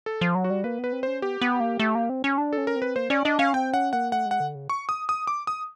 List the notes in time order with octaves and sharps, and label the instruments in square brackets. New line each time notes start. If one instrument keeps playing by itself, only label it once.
[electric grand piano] A4
[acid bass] F3
F#3
[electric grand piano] F#4
[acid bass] G3
[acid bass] A#3 [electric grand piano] B4
[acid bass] B3 [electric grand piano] B4
[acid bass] C4
[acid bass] C#4 [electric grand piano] C5
[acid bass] B3 [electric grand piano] G4
[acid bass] B3
A#3
A3
A#3
C4
C#4
D4
[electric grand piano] A4
[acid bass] C#4
[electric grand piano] A#4
[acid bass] C4
[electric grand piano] B4
[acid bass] A#3 [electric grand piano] C5
[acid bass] C#4 [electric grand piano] D5
[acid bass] D4 [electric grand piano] D#5
[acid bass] C#4 [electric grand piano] F5
[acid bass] C4 [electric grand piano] G5
[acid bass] C#4 [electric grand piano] F#5
[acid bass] A#3 [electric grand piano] F#5
[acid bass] A3 [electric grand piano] F#5
[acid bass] G#3
[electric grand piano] F#5
[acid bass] D3
C#3
[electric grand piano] C#6
D#6
D#6
D6
D#6